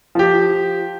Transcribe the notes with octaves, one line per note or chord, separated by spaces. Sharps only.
F3 G4